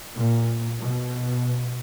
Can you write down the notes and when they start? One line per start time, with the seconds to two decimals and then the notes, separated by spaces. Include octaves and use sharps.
0.16 A#2
0.80 B2